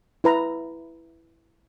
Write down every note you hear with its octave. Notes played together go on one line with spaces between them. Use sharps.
E4 B4 A#5